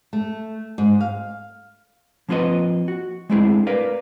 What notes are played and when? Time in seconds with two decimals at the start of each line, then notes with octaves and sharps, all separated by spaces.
0.13 A3
0.78 G#2
1.00 F5
2.29 F3 A#3 C4 F4 B4 D#5
2.88 F#4
3.30 G#3 A3 C4 D4 E4 G#4
3.67 A#4 B4 D5 F5